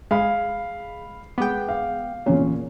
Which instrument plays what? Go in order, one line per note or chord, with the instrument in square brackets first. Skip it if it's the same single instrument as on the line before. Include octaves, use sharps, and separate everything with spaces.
[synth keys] G#3 [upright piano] F5 B5
[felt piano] G#3 D6 [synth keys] B3 G5
[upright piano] F5
[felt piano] E2 C#4 C#5 [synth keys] A#2